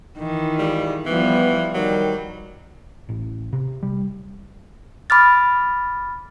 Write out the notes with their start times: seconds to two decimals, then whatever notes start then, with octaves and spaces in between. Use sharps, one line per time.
0.18 D#3 E3
0.59 G3 G#3 F4
1.06 E3 F3 G3 B3
1.74 D#3 F#3 G3 A#4
3.09 A1
3.53 C3
3.83 G3
5.10 B5 D6 F6 A6